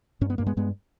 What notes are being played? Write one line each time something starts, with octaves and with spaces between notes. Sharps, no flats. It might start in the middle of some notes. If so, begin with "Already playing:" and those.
G2 C#4
B3
G2 A#3
G#3 B3
G2 G#3 B3